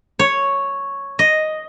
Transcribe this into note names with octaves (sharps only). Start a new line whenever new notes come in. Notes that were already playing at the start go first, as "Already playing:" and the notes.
C#5
D#5